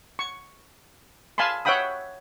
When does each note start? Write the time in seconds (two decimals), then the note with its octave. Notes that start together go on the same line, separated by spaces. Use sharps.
0.19 C#6
1.38 F5 G#5 A5 B5 C6
1.65 C#5 E5 F#5 G5 B5 D#6